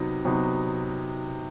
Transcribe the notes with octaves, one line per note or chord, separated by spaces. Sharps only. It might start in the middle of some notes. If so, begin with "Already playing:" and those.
Already playing: C3 F#3 B3 D#4
C3 F#3 B3 D#4